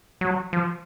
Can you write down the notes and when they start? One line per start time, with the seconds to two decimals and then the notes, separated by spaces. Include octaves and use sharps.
0.21 F#3
0.53 F3